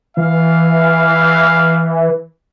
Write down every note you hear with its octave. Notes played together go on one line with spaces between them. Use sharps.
E3 F5